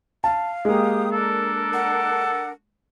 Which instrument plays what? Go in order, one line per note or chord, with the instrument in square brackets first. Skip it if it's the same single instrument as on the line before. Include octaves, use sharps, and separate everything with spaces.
[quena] F5 [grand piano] A5
[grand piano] G#3 A#3 [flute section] G4 D#6
[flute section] D4 A#4 [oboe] A4
[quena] F#5